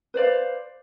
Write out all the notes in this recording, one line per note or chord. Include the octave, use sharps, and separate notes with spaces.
B4 C5 D5 F5